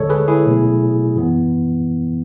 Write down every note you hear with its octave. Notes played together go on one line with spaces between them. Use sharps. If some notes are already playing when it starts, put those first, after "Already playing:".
Already playing: D2 D3 G#3 A4 C#5
G#4 B4
E4 G#4
B2 F#3 A3
F#2 E3 B3